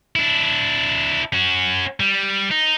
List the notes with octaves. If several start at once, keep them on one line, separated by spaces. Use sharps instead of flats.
D4 E4
C#4 F#4
G3
D#4